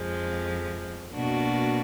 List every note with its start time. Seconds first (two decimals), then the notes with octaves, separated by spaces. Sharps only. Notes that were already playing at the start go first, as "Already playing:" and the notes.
Already playing: F2 F3 G#3
1.14 B2 A#3 D4 F#4